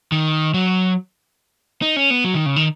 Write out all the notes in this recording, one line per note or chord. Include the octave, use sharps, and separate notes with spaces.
D#3
F#3
D#4
C#4
B3
F#3
D#3
C#3
D#3